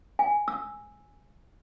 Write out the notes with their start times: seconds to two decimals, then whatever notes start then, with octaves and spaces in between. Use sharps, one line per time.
0.19 G#5
0.48 E6